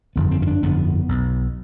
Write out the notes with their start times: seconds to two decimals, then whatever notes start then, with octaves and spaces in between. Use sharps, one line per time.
0.16 G1 F2 D3 B3
0.31 C4
0.42 C#4
0.47 D4
0.62 G1 F2 D3 B3
1.09 B1 B2